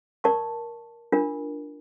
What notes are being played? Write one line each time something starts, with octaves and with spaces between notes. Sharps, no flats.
A#4 D5 A5 C#6
D4 F4 A#4